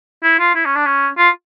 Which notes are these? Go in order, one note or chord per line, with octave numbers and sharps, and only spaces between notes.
E4
F4
E4
C#4
D4
C#4
F4